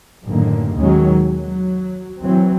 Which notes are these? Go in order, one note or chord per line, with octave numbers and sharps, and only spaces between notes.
A1 F#2 D3 D#3 A#3
D#2 B2 D#3 F#3 G#3 C#4
F#3
E3 F#3 C4